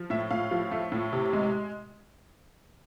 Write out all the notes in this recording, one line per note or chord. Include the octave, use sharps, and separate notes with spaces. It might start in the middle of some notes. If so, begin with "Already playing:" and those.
Already playing: F3
A2 E5
A2 F5
F3
A3
A2
C3
G#3